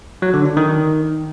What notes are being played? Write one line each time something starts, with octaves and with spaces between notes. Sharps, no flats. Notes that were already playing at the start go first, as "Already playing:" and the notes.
F#3
D3
D4
D#3